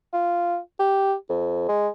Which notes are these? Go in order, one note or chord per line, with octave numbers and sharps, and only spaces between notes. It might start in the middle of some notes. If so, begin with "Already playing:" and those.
F4
G4
F2
G#3